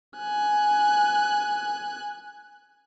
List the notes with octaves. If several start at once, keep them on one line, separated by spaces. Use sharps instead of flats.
G#5 F#6